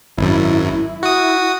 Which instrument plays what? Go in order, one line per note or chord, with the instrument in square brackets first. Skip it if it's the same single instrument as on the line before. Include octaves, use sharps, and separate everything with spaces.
[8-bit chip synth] G#1 F#2 [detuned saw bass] E4
[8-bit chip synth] F#4 D#6